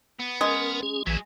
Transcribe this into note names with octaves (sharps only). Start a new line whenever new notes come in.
B3
G#3 C#4 A#4
C#4 G#4
A#1 E3 F#3 G#4